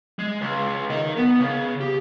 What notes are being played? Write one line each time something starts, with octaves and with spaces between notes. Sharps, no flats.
G#3
C#2
A#4 D#5
B3
C#3
G4